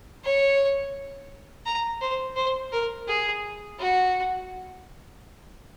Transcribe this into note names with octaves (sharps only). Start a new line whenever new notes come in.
C#5
A#5
C5
C5
A#4
G#4
F#4